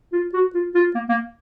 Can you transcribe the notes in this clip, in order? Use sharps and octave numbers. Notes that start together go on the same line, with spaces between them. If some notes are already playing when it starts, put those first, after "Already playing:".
F4
F#4
F4
F4
A#3
A#3